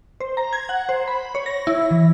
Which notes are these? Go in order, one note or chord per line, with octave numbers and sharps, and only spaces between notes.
C5
A#5
G#6
F#5
C5
B5
C#5
A#6
E4
E3